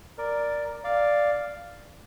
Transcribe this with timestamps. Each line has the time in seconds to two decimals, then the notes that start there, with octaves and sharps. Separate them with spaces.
0.18 A#4 D5
0.84 D5 F5